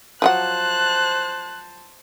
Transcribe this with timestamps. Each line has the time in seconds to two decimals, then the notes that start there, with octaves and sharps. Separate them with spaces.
0.22 F3 F#3 C5 F#5 A5 F#6